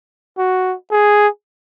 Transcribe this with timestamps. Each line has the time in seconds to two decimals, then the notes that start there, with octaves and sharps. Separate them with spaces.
0.38 F#4
0.91 G#4